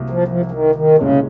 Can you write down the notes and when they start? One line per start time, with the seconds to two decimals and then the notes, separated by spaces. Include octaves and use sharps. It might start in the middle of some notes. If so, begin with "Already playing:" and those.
Already playing: C2 C3 F#3 A#3
0.10 F3
0.28 F3
0.45 F3
0.51 D#3
0.75 D#3
0.98 C2 A#2 C#3 G#3 C#4